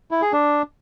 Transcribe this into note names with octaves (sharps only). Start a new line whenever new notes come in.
E4
G#4
D4